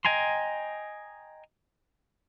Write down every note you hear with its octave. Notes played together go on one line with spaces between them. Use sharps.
D#5 G5 G#5 A#5 C6